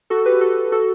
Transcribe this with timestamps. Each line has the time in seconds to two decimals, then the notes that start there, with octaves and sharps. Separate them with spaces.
0.10 F#4 A4
0.26 G4 B4
0.41 F#4 A4
0.72 F#4 A4